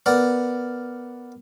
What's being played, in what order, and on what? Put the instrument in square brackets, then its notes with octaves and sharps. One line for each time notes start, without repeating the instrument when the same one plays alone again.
[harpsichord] B3 A#4 D5